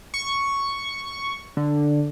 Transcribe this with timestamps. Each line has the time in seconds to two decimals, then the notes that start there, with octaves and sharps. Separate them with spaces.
0.14 C#6
1.57 D3